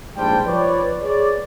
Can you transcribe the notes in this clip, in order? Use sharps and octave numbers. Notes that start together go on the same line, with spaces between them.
A#1 G#2 G3 C5 G5 A5
F3 B4 C#5 D5
G#4 B4 C#5 D5